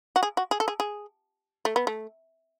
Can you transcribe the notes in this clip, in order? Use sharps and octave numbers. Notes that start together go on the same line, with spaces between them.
F#4
G#4
F#4
G#4
A4
G#4
G#4
A3
B3
A3